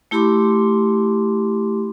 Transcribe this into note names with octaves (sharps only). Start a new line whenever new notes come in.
A3 E4 G4 B5 C6 D6